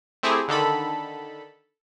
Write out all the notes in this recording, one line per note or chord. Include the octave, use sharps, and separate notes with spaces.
A3 C4 E4 G4 G#4
D3 D#3 A4 B5